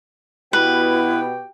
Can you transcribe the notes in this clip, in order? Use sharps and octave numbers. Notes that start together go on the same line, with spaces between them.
B2 B3 E4 F#4 G4 B4 G5